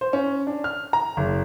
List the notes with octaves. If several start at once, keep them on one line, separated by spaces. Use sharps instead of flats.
C5
C#4
D4
F6
A#5
F#1